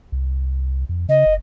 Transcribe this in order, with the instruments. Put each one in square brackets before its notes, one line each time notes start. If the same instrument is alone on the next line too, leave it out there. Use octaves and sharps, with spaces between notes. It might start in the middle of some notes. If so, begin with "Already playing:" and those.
[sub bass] C2
F2
[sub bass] C#3 [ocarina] D#5
[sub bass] F#1